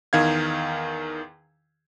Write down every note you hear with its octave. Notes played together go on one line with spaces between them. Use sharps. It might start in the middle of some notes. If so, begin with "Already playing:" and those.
E2 D#3 F5 G#6